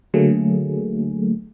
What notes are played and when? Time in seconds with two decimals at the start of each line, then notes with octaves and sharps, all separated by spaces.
0.14 D3 F#3 A3 A#3 G#4